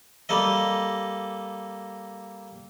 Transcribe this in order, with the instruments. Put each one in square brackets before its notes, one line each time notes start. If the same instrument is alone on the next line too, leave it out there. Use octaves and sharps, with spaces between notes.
[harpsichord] G3 A#3 A4 D#5